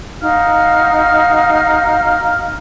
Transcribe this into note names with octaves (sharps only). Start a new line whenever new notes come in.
D#4 F#4 F5 F6